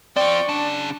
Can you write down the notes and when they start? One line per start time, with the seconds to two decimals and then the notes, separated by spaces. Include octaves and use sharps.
0.16 C4 F4 D5 G5 C#6
0.49 C#3 D4 A5